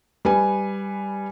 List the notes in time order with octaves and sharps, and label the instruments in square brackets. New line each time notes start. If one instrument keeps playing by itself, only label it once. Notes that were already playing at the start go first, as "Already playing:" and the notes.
[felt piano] G3 B4 G#5